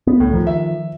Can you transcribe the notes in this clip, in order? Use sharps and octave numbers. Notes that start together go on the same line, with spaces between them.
B3
C#2 A2
D#3 F3
E5